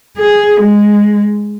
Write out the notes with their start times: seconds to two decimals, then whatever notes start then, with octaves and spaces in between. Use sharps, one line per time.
0.18 G#4
0.61 G#3